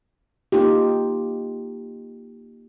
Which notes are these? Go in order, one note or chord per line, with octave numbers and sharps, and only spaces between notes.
A#3 D#4 F4 G4